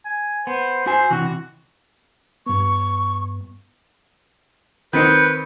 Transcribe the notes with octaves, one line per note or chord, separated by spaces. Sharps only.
G#5
B3 C5
F#4 C5 G#5
C3 E3 F#4
G2 B3 C#6
D#3 C4 D#4 B4 G6 C#7